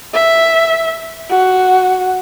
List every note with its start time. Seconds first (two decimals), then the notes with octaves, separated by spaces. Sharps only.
0.13 E5
1.30 F#4